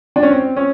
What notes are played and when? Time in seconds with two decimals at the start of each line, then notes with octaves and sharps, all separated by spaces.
0.16 D4
0.23 C#4
0.31 C4
0.56 C#4